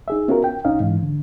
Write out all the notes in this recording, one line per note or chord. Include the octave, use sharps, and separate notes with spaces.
D#4 G#4 E5
B3 C#4 F4 F#4 A#4
G5
C2 C#4 D#4 F5
G#2 E3
D3